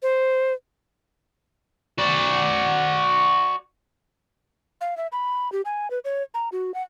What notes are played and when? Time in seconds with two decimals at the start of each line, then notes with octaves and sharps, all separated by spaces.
0.02 C5
1.98 F#4 D5
4.81 F5
4.97 E5
5.12 B5
5.52 G4
5.65 G#5
5.91 B4
6.05 C#5
6.34 A#5
6.52 F#4
6.74 F#5